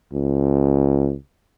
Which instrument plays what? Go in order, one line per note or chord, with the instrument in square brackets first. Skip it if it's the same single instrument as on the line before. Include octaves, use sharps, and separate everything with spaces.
[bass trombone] C#2